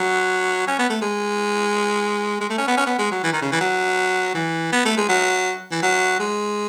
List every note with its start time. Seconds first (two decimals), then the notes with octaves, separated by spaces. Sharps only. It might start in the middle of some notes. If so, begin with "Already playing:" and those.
Already playing: F#3
0.68 C#4
0.79 B3
0.90 A3
1.01 G#3
2.41 G#3
2.50 A3
2.58 C#4
2.68 B3
2.77 C#4
2.87 B3
2.99 G#3
3.11 F#3
3.23 E3
3.33 D#3
3.42 C#3
3.52 E3
3.60 F#3
4.35 E3
4.72 B3
4.85 A3
4.97 G#3
5.09 F#3
5.71 E3
5.83 F#3
6.19 G#3